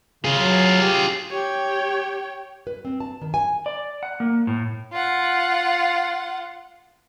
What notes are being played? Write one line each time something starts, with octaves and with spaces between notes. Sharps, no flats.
C#3 F4 G#4
F#3
G4
G4 C#5 G5
B4
C4
A5
D#3
G#5
D5
F#5
A#3
A2
F4 F#5